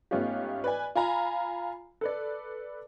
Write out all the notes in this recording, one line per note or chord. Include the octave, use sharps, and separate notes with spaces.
G#2 A3 B3 C#4 F4 G4
B4 D5 G#5
F4 G#5 A#5 B5
A4 B4 D5